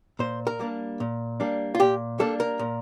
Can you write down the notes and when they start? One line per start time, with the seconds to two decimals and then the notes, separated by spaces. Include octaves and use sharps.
0.19 A#2 C5
0.47 A#4
0.60 G3 A#3 D4
1.00 A#2
1.40 G3 A#3 D4
1.75 F4
1.80 A#2 G4
2.19 G3 A#3 D4 A4
2.40 A#4
2.59 A#2